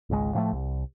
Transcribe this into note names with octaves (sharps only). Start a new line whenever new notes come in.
G#1 C#2 G#3
A2 F3 G#3 A3
C2